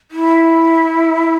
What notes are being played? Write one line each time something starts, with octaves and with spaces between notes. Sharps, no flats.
E4